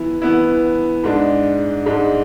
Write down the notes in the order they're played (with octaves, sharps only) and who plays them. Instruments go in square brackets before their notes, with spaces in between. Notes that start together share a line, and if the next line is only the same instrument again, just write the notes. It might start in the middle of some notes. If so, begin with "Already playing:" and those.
Already playing: [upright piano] E3 B3 E4
E3 B3 E4
G#2 G#3 D4
G#2 G#3 D4